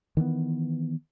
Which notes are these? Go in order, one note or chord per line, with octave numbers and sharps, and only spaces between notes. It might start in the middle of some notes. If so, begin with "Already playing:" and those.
D#3 E3 G3 B3